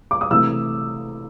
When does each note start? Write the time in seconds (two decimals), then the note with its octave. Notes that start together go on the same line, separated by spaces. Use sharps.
0.11 D6
0.21 D#6
0.31 C3 E3 A3 E6